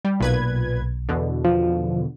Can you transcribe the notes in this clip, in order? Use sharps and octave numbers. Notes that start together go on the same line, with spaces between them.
G3
B1 A#2 B4 G#6
E2 B2 D3
F3